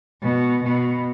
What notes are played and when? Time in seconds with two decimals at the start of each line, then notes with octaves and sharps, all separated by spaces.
0.22 B2
0.64 B2